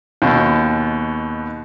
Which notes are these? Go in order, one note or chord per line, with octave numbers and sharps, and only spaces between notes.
D#2 B2